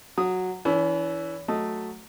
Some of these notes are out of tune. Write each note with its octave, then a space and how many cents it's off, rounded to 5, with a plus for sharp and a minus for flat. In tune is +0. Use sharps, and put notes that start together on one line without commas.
F#3 -5 D#6 +0
E3 +0 C#4 +45
F#3 +0 A3 +0 D#5 +0